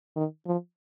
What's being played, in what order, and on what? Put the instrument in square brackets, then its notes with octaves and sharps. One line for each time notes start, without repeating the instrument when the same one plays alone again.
[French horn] D#3
F3